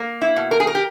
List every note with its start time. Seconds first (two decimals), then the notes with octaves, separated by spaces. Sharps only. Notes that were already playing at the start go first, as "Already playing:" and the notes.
Already playing: A#3
0.22 E4
0.36 B2
0.51 A#4
0.60 G#4
0.67 A#4
0.75 G4